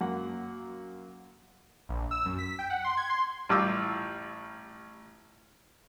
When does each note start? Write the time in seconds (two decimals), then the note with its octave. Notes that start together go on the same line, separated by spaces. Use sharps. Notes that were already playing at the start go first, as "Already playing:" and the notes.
0.01 F#2 A#3 F#5
1.89 A#1
2.11 E6
2.26 F#2
2.39 B6
2.59 G5
2.70 F#5
2.84 C6
2.97 G#6
3.09 C6
3.49 A1 G3 F4 D6 E6